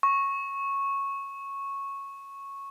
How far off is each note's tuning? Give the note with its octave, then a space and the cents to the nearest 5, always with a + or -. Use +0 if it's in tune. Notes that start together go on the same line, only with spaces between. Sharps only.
C#6 -10